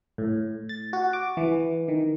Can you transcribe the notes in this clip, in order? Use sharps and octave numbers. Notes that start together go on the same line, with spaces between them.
A2
A6
F#4
D6
E3
D#3